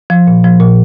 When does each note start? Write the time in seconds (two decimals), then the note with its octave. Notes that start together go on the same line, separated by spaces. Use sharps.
0.10 F3
0.27 A#2
0.44 F3
0.60 A#2